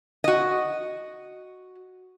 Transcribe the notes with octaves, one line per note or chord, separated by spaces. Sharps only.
F#4 D#5